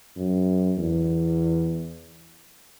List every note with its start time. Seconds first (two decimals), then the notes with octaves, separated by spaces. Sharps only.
0.16 F#2
0.77 E2